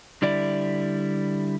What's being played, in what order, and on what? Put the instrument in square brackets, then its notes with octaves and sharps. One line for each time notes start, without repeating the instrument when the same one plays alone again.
[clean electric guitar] D3 G3 E4 D5